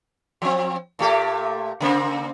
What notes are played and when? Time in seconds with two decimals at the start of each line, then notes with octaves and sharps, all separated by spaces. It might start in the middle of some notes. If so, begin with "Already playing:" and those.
0.42 F3 C4
0.99 A#2 A3 G4
1.80 C#3 A#3 C4